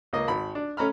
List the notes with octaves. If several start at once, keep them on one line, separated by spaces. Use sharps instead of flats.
C#2 A#3 D#5
G#1 B5
D4
A3 C#4 A#5 B5 F6